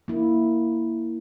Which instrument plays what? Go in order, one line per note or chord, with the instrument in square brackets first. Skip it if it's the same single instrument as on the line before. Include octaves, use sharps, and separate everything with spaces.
[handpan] A#3 E4